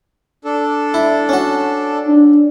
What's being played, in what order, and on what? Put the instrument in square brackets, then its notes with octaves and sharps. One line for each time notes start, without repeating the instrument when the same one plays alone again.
[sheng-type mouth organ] D4 A4
[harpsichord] E4
C#4 F#4
[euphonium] D4